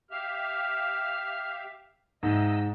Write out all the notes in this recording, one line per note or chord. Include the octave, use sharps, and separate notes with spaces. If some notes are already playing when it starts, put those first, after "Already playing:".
G4 E5 F5 F6
G#2 C3 D#5 E6